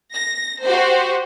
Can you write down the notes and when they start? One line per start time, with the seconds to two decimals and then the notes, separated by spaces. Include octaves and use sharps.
0.13 A#6
0.63 F#4 G4 C5